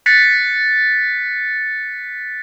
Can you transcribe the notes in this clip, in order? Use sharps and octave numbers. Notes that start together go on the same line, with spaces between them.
F#6 A6 B6 C#7